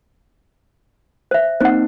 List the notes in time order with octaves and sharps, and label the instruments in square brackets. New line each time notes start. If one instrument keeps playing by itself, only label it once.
[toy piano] C5 E5
[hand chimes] A#3 C4 D#4 [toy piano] C5 F#5